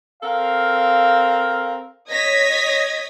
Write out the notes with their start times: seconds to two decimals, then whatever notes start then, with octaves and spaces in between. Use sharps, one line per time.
0.23 C4 A4 A#4 F5
2.10 C#5 D#5 D#6 G#6 A#6 B6